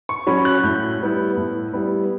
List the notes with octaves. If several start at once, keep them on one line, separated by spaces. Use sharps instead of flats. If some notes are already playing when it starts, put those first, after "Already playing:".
C#6
F#3 C#4 B5
F#6
A2 G6
G3 B3 E4
A2
G3 B3 E4